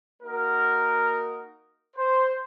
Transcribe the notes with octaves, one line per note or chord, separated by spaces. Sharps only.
A#3 D#4 F#4 A#4
C5